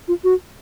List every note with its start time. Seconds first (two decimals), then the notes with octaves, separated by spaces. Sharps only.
0.08 F4
0.24 F#4